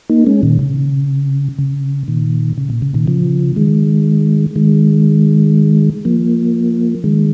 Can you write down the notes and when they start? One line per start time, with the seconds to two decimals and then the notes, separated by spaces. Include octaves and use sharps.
0.09 A#3 D#4
0.27 G#3 C#4
0.43 A#2 D#3
0.59 C#3
1.59 C#3
2.08 A#2 D#3
2.58 C#3
2.70 A#2
2.82 C#3
2.94 A#2 D#3
3.07 C#3 F3
3.56 D#3 G#3
4.56 D#3 G#3
6.05 F3 A#3
7.04 D#3 G#3